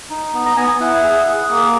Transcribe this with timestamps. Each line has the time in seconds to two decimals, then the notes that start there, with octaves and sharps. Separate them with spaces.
0.10 D#4
0.34 B3
0.46 A#5
0.57 B3 G#5
0.68 G#5
0.80 E4 F#5
1.03 G#4
1.27 G#4
1.50 A#3
1.57 A#4